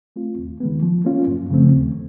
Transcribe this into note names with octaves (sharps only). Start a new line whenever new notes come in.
A3 C4 F4
D#2
D#3 G#3 B3
F3
A#3 C#4 F4
F#2
C#3 F3 A3 C4
D#2